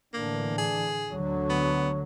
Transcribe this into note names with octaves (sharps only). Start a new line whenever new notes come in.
A2 D3 E3 A#3 D4
G#4
D2 D3 F#3 C#5
B3